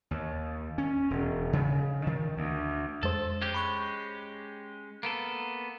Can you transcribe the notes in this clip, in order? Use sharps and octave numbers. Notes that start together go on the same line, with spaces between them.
D#2
C#4
E1
C#3
D#3
D2
F2 G#3 A4 C5
G#3 C#4 G4
B5 C#6 F#6
A#3 B3 A4 D7